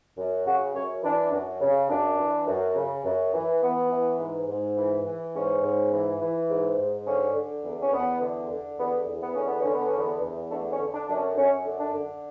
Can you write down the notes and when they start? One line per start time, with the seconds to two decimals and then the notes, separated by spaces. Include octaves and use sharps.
0.17 F#2
0.46 C#3 F#4
0.74 F#2 C#5
1.03 E3 D4
1.32 F#2
1.61 C#3
1.89 F#2 D4
2.18 E3
2.47 F#2
2.76 C#3
3.05 F#2
3.33 E3
3.62 E3 B3
3.90 E3
4.19 G#2
4.48 G#2
4.77 E3
5.05 E3
5.34 G#2 C#4
5.62 G#2
5.91 E3
6.20 E3
6.49 G#2
6.78 G#2
7.06 D3 C#4
7.34 D3
7.64 E2
7.81 C#4
7.93 E2 B3
8.21 D3
8.49 D3
8.78 E2 B3
9.07 E2
9.22 B3
9.34 D3 C#4
9.48 B3
9.60 D3 C#4
9.73 B3
9.87 C#4
9.94 E2
9.99 B3
10.22 E2
10.50 D3 A3
10.72 C#4
10.80 D3
10.94 D4
11.08 F#2 D4
11.15 C#4
11.36 F#2 C#4
11.65 D3
11.79 D4
11.93 D3